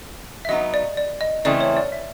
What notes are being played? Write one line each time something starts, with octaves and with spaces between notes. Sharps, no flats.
E5
F#3 B3 D#4 D#5
D5
D5
D#5
C#3 E3 A3 C4 D5
C#5
D5
E5